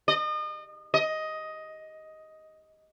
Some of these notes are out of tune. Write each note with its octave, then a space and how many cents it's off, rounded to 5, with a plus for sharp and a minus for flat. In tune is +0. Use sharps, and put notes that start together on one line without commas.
D#5 -35
D#5 +10